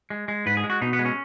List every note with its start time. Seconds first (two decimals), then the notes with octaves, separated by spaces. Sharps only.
0.10 G#3
0.28 G#3
0.46 G#2 B4
0.57 G#4
0.64 G#3
0.70 F#4
0.81 B2 D#4
0.93 B3
0.99 G#3
1.05 C#4